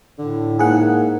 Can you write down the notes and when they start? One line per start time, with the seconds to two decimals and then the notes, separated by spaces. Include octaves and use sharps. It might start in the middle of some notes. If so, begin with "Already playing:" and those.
0.18 A2 D3
0.59 G#2 A#3 G#4 F#5